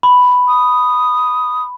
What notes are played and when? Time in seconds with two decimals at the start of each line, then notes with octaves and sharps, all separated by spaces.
0.03 B5
0.48 D#6